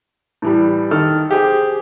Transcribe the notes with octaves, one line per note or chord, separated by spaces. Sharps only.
A2 E3 G3
D#3 A4 F6
G4 G#4 C5